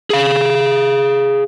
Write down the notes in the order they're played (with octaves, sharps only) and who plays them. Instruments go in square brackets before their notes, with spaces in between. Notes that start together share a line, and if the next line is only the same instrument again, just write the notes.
[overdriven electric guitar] G#4 F5